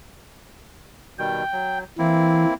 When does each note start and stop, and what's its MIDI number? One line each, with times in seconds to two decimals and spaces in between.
1.19 1.44 47
1.19 1.44 51
1.19 1.44 55
1.19 1.78 79
1.52 1.84 54
1.98 2.45 52
1.98 2.54 58
1.98 2.54 60
1.98 2.54 64